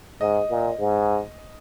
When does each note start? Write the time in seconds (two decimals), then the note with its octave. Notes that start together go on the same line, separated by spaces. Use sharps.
0.21 G#2 D#5
0.50 A#2
0.79 G#2